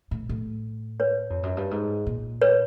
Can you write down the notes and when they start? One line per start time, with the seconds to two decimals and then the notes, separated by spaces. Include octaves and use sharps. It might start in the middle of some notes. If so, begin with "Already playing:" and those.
0.11 A2
0.29 A2
1.00 B4 C#5
1.30 F2
1.43 F#2
1.57 G2
1.71 G#2
2.06 A#2
2.42 B4 C#5